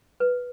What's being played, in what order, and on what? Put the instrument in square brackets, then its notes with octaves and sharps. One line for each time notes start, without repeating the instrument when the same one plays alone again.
[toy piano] B4